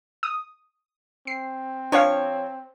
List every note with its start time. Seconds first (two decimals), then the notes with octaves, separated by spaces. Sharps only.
0.23 D#6
1.27 C4 C7
1.92 F3 D4 C#5 F5